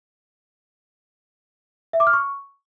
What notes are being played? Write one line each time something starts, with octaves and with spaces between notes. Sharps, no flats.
E5
D6
F6
C#6